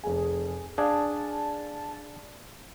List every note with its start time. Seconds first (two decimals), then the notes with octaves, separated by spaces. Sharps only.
0.03 F1 G#4 G#5
0.78 D4 G#4 D5 F5 G#5 A5